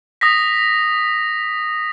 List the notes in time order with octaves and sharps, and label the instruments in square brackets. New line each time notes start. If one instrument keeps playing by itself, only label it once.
[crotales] D#6 A#6 B6